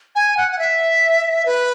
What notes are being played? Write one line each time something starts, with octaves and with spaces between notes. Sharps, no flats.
G#5
F#5
F#5
E5
B4